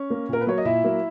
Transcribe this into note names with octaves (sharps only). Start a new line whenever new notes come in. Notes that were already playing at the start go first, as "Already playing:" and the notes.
Already playing: C#4 C#5
A#3
A#2 A#4
B4
F#3 A#3 C#5
D#5
A#2 E4 E5
F#3 A#3